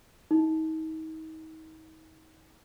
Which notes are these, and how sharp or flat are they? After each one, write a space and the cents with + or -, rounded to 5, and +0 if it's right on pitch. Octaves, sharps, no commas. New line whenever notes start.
D#4 +35